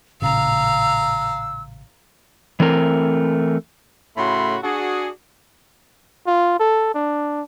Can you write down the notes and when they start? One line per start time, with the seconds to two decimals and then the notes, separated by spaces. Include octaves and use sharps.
0.22 A1 A#2 C#3 F5 A#5 E6
2.60 E3 A3 C4 A#4
4.17 A2 C#3 A3 F#4 B5 C6
4.64 D4 F#4 G#4
6.27 F4
6.60 A4
6.95 D4